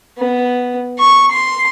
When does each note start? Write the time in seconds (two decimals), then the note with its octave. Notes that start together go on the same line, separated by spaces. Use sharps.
0.19 B3
0.99 C#6
1.32 C6